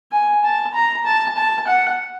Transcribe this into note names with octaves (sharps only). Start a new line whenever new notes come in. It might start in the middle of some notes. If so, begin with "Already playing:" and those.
G#5
A5
A#5
A5
A5
F#5